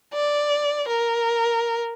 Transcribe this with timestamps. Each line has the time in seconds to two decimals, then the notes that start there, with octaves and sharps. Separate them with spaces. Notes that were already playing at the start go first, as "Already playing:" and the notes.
0.13 D5
0.86 A#4